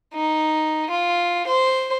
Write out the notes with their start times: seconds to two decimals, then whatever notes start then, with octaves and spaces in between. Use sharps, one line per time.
0.14 D#4
0.90 F4
1.47 C5